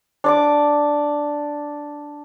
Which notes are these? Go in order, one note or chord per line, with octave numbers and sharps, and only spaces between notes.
D4 D5 D6